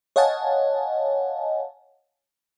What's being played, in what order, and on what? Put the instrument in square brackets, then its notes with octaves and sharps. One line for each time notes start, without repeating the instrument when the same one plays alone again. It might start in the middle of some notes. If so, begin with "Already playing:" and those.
[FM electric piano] C#5 D#5 F5 F#5 G#5 A5